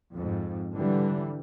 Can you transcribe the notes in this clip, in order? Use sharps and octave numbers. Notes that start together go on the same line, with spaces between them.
F2 G#2
D3 E3 G3